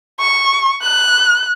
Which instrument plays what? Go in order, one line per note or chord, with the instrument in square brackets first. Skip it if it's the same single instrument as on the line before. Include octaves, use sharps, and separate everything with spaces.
[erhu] C#6
F#6